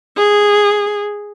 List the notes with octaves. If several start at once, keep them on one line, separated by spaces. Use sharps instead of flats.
G#4